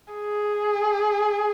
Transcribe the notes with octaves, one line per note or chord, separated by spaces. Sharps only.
G#4